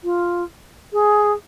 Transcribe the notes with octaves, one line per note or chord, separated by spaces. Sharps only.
F4
G#4